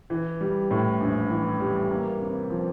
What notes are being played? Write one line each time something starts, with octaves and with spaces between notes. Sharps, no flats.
E3
G3
A2
A#1
E3
G3
A#3
C3
F3